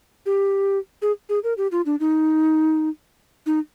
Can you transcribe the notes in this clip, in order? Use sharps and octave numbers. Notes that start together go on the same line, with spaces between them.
G4
G#4
G#4
A#4
G4
F4
D4
D#4
D#4